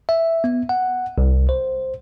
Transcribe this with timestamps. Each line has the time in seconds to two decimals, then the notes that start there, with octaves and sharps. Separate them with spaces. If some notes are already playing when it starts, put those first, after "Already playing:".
0.09 E5
0.44 B3
0.69 F#5
1.18 C2
1.49 C5